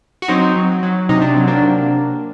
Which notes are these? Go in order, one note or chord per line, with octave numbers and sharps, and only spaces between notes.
F#4
F#3 C4 D#4
F#3
F#3
C3 D#4
D4
F#3 C4
A#3 D4
C3